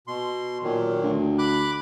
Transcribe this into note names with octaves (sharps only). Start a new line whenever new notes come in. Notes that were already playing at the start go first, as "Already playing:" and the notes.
B2 C6
A#2 D#3 F#3
D2
B5 D6 F#6